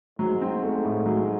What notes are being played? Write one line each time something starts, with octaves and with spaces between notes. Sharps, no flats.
G#2 F#3
C4
A3
A2
F#3